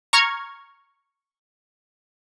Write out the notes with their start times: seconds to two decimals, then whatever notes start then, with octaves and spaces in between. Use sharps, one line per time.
0.13 A#5 C#6 F6 G#6